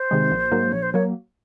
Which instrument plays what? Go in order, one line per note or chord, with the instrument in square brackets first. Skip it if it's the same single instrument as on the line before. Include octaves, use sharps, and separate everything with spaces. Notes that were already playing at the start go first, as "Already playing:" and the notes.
Already playing: [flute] C5
[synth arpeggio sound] C3 D#3 G#3
A#1
G#2 F#3 A#3
[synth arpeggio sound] A#1 [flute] C#5
[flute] C5
[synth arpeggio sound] F#3 A#3 [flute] C#5